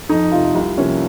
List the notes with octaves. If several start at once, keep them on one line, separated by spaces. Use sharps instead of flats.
F2 D#4
C3 F3 F4
C2
C3 F3 A#3 C#4